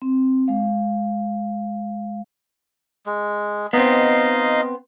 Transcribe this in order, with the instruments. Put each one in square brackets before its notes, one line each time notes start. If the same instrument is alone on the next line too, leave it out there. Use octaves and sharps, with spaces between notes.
[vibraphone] C4
G#3 F5
[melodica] G#3
[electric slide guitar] B3 C4 [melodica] D#4 D#5 F5